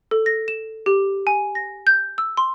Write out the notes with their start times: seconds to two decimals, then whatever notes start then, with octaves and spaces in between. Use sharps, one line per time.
0.11 A4
0.26 A#6
0.48 E7
0.86 G4
1.27 G#5
1.55 A#6
1.87 G6
2.18 E6
2.37 C6